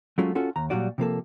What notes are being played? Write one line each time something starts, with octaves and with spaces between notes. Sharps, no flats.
F#3 G#3 A3 C#4 F4
C#4 F4 F#4 A4
D#2 A#5
A#2 F#3 G3 F#4 D5
C3 F3 A#3 A4